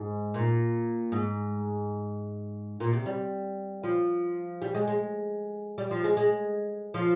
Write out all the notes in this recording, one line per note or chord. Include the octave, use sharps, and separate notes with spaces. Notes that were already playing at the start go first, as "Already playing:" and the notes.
Already playing: G#2
A#2
G#2
A#2
C3
G3
F3
G3
G#3
G#3
G3
F3
G#3
G#3
F3